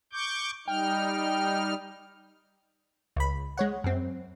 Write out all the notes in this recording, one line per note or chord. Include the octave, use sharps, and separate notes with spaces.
C#6 D6 G6
G3 D#4 G5 F6
C#2 B5
G#3 C#5 F#5
F#2 C4